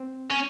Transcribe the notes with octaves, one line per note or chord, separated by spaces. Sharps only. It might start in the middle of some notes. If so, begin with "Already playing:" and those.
Already playing: C4
C#4